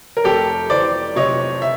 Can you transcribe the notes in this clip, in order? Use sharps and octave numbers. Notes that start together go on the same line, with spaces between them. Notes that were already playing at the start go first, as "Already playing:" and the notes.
A#4
F1 G4 A4
E3 C5 D5
C3 C#5 D#5
E5